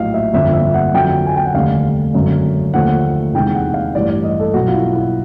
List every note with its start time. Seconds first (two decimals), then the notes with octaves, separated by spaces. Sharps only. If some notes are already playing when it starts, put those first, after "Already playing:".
Already playing: A#1 A2 F#3 D#5 F5
0.14 E5
0.33 G1 F2 D3 E5
0.54 E5
0.74 F#5
0.94 F2 D3 F#3 G5
1.26 G#5
1.36 G5
1.45 F#5
1.54 F1 D#2 D3 G3 F5
2.14 G#1 F#2 D3
2.74 D#2 D3 F3 A3 F#5
3.34 E2 C3 D#3 G#3 G5
3.55 F#5
3.74 F5
3.95 A1 G2 E3 G3 D5
4.10 D5
4.24 D#5
4.39 A4
4.54 B1 B2 F#3 F#4
4.68 F4
4.74 E4
4.95 E4